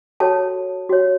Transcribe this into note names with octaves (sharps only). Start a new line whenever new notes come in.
F#4 A4 C#5 A5
F#4 C#5